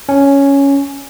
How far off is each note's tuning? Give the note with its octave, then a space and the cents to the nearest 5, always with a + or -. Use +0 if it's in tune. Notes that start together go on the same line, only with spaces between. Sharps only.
C#4 +5